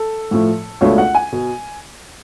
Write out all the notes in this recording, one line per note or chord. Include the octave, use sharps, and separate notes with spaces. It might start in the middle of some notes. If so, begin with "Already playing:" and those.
Already playing: A4
A2 F3 A3
C#2 B2 A3 D4 C#5
F#5
G#5
B2